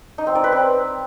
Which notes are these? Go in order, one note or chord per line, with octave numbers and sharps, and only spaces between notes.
D#4
C4
D5
B4
C4